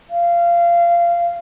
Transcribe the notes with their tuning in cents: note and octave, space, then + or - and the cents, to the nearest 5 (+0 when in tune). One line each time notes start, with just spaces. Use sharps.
F5 -20